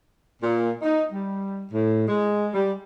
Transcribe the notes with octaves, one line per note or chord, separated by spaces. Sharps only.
A#2
D#4
G3
A2
G#3
G3